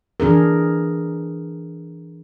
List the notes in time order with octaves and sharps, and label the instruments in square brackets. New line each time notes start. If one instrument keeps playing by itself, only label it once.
[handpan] E3 D4 G#4 A#4